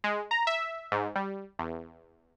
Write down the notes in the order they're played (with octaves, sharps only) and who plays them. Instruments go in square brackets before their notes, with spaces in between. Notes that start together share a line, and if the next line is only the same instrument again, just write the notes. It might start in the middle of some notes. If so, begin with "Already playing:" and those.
[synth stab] G#3
A#5
E5
G#2
G3
E2